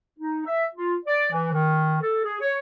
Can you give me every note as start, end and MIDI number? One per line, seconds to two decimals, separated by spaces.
0.19 0.43 63
0.46 0.64 76
0.75 0.95 65
1.05 1.30 74
1.32 1.50 52
1.52 1.98 51
2.02 2.22 69
2.25 2.37 68
2.40 2.58 73